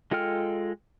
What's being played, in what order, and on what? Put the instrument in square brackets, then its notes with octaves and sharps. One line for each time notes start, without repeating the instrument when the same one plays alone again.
[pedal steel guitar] G#3 F4 A4 G5 F6